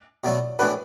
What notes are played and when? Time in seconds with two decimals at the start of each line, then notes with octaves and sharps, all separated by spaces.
0.23 B2 F#3 A3 F#4 D5
0.59 A2 E3 B3 D4 F#4 B4